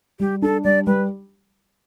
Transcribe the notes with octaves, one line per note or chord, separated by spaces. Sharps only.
G3 G4
D4 A4
G3 D5
G3 B4